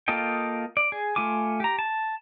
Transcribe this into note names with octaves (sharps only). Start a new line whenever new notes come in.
A#3 F4 A4 D#5 G5
D5
G#4
A3 F4 G#5 D6
G4 A#5
A5